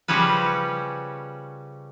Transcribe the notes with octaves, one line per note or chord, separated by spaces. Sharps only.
C#3 F3 G3 C#4 B4